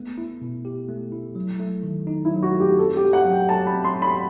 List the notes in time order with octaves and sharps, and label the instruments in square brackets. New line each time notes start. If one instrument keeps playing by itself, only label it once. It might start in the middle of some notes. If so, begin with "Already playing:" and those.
Already playing: [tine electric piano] A3 B3
E4
B2
G4
A3
E4
F#3
A3
D#3
D#4
[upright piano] E4
[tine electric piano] F#3
[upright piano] F#4
[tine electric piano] A3
[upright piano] G4
[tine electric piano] C4 [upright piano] A4
[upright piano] G4
[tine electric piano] F#4
[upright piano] F#5
[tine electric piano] F#3
[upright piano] G5
[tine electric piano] A4 [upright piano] A5
[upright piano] B5
[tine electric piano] C4
[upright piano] C6
[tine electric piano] F#4
[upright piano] B5